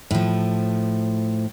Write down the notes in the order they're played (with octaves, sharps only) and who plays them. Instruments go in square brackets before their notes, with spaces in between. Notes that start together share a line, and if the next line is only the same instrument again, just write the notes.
[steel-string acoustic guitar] A2 F3